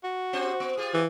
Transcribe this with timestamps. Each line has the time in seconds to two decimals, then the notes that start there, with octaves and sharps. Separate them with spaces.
0.03 F#4
0.33 C4 G4 C5
0.60 B3
0.77 F4 G4 G#4
0.94 E3